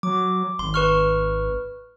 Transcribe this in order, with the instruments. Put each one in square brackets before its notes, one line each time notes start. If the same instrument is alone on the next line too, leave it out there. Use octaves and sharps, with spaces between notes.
[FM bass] F#3 [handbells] D6
[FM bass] G#1 [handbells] C6
[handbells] B4 C#6 F6